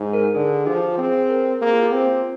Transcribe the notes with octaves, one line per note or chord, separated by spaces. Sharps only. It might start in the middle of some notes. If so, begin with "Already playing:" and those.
Already playing: G#2
A#4
D3 G#4
F3 G4
C4 G#4
A#4
A#3 G#4
F4
G4
C4
F4